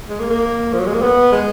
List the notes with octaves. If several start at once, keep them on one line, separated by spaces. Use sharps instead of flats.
G#3
A#3
A#3
F3
F#3
G#3
A#3
B3
G#3